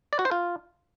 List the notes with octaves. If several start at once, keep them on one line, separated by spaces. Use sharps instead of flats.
D5
F#4
C5
F4